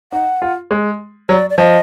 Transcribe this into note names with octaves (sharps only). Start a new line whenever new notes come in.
D#4 F#5
F4
G#3
F#3 D5
D5
F3 D#5